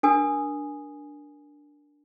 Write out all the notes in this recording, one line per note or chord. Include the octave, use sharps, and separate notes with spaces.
D4 A#4 G#5 D#6